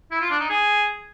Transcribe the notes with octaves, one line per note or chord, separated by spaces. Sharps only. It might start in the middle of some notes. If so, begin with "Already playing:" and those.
E4
F4
D4
D#4
G#4